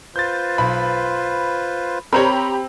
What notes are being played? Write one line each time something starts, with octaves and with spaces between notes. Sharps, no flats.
F4 B4 C5 G6 A6
B1 B5
C4 G4 A#4 C5 C#5 A#5 B5